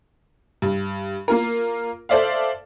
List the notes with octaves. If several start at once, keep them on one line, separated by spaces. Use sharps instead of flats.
G2
A#3 F4 A#4
A4 C5 D5 E5 F5